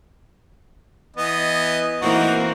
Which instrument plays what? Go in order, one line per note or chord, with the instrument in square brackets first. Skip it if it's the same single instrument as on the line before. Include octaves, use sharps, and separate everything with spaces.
[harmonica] E3 B3 D#5
[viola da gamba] E3 A#3 C4 [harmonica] D#4 F#4